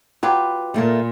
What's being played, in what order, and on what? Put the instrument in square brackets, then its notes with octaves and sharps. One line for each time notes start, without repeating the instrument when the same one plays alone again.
[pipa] F#3 G4 [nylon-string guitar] F4 B4
[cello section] A#2 [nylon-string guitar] G3 A3 A#3